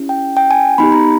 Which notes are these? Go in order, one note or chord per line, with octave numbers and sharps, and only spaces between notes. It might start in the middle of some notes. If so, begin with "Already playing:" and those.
Already playing: C#4 E4 G4
G5
G5
G#5
B3 D#4 G4 B5
A#5